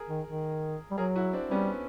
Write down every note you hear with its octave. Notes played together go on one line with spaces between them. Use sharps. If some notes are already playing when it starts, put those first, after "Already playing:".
Already playing: G#4 A#4
D#3
D#3
G3
F#3 G#4 A#4
E4 F#4
C4 D4
G3 B3 C#4